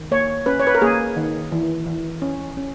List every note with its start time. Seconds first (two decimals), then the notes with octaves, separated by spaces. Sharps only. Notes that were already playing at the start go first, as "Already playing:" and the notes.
Already playing: D#3
0.11 A#3 C#5
0.46 C#4 B4
0.60 C#5
0.67 B4
0.75 A#4
0.82 A#3 G#4
1.16 D#3
1.52 E3
1.86 E3
2.22 C#4
2.57 C#4